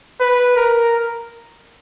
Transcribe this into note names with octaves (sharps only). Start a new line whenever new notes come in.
B4
A#4